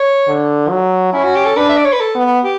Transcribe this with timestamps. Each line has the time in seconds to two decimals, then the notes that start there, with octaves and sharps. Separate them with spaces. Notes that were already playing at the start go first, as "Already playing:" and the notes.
Already playing: C#5
0.28 D3
0.70 F#3
1.13 C#4 E4
1.24 F#4
1.35 G4
1.46 A4
1.57 D4 B4
1.69 E5
1.77 D5
1.85 C#5
1.93 B4
2.00 A4
2.15 B3
2.43 G4